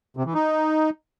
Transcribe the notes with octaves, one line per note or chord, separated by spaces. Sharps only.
C3
E3
D#4